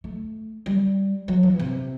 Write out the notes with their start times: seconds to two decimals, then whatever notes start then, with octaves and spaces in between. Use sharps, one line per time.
0.04 A3
0.66 G3
1.28 F#3
1.43 E3
1.59 C3